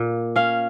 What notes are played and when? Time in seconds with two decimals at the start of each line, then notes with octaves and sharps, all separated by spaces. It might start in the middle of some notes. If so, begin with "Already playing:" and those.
Already playing: A#2
0.36 C#4 F5